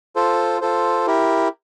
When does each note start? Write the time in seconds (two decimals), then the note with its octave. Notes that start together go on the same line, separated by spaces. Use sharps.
0.16 F4 A4 C5
0.61 F4 A4 C5
1.07 E4 G4 A#4